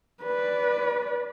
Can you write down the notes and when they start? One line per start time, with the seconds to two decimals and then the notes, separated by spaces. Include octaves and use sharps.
0.23 B4 D5